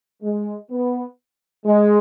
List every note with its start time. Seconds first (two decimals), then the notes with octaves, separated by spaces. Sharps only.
0.23 G#3
0.71 B3
1.66 G#3